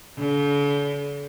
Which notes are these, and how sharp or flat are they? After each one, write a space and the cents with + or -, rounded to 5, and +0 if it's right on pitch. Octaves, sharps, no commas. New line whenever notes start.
D3 -45